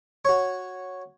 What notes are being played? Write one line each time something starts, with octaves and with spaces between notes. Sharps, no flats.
F#4 C#5